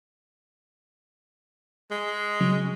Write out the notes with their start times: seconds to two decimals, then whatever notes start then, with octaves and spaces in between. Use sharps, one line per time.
1.91 G#3
2.40 C#3 F#3